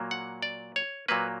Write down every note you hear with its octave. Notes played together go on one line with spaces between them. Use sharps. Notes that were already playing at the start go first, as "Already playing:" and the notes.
Already playing: A#2 F#3 A#3
F#5
D5
C#5
A#2 F#3 A#3 B4